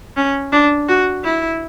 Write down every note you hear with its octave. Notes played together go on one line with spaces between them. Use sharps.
C#4
D4
F#4
E4